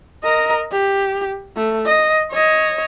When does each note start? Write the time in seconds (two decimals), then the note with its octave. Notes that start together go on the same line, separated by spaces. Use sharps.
0.24 A#4 D#5
0.72 G4
1.56 A3
1.86 D#5
2.31 C#5 D#5